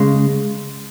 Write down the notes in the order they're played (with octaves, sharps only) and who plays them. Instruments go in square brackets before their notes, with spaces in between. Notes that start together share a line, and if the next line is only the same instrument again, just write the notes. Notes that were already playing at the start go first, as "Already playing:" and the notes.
Already playing: [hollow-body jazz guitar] C#3 G#3